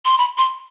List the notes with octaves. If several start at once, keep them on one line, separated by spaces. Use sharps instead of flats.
C6
B5
C6